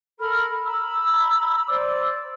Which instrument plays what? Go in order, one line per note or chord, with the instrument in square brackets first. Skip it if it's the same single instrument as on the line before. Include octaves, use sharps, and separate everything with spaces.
[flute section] A4 A#4 B5 F6
A#5 B5 E6
C5 D5 D6 E6